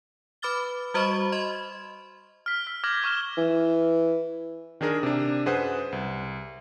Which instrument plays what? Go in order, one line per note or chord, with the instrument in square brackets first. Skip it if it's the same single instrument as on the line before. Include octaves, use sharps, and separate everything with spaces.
[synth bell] B4 B5 D6 F6 A6 G7
G3 F#4 C5 D#5 B5 C#6
D#5 B5 C6
[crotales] F6 B6
E6 F6 B6
D6 F6 G6 G#6 A#6 F#7
C#6 D6 F6 E7 G7
[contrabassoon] E3
[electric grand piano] D#3 D4 G#4 A#4
C3 D4
F#2 G#4 B4 C5 F#5 D#6
C2